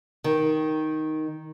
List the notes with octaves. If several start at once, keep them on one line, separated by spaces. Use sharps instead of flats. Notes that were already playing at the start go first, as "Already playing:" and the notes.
D#3